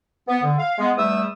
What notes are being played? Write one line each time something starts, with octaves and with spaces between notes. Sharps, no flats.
B3
D3
F5
G#3 B3
E2 G3 A3 E5 D#6 E6